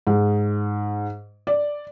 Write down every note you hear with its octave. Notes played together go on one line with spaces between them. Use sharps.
G#2
D5